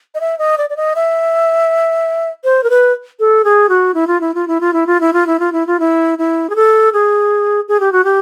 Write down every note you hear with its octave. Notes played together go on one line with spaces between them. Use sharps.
D#5
E5
D#5
D5
D5
D#5
E5
C5
A#4
B4
A4
G#4
F#4
E4
F4
E4
F4
E4
F4
E4
F4
E4
F4
E4
F4
E4
F4
E4
E4
G#4
A4
G#4
G#4
G4
F#4
G4